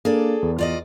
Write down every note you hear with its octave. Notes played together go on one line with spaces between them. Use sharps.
A#3 D4 G#4 A4 D5
E2
F4 D5 D#5